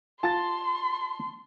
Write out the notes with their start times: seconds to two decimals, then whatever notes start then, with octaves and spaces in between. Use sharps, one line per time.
0.23 F4 A5 A#5 C6 A6